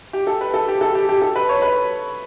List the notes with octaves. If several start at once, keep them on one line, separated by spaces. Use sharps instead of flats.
G4
A4
B4
A4
G4
A4
G4
G4
A4
B4
C#5
B4